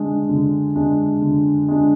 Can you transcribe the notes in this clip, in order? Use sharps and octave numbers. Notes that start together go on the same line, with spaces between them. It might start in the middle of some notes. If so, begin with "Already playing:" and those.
Already playing: D3 G#3 D4
D3
G#3 D4
D3
G#3 D4